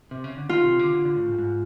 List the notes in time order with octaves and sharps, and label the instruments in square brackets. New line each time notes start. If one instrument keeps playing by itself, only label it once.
[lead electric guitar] C3
C#3
D3
[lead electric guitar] D#3 [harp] F4
[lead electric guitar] C3
D3
D3
D3
A2
G#2
G#2